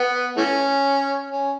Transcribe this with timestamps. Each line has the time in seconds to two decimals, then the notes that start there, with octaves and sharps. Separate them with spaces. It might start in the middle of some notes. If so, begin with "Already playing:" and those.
Already playing: B3
0.37 E3 A3 C#4
1.30 C#4